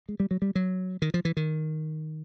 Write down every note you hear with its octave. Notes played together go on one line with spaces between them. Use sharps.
G#3
G3
F#3
G3
F#3
D#3
F3
E3
D#3